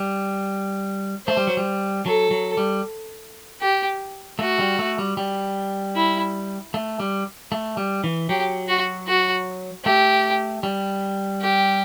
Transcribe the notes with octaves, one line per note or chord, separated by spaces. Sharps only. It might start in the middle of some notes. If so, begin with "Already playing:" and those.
Already playing: G3
A3 C5
G3
F#3
G3
F#3 A4
F#3
G3
G4
A3 F#4
G3
A3
G3
G3
E4
A3
G3
A3
G3
E3
F#3 G4
F#4
F#4
A3 G4
G3
G4